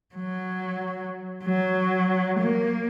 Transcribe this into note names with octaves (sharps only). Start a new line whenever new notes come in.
F#3
F#3
A#3